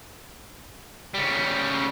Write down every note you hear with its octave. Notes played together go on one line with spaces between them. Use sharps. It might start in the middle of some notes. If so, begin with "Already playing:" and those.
C#3 G3